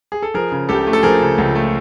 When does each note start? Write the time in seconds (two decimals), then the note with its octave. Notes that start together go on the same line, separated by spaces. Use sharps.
0.12 G#4
0.23 A4
0.34 F3 G#4 A#4
0.52 C#3
0.69 C#2 G4 A4
0.87 A3
0.93 A4
1.03 F3 G#4 A#4
1.21 C#3
1.38 C#2
1.55 A3